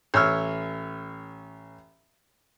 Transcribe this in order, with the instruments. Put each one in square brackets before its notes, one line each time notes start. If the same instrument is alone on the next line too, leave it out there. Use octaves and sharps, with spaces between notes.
[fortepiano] A1 C#5 E6 F6